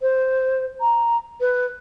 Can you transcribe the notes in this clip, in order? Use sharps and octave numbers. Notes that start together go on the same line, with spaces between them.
C5
A#5
B4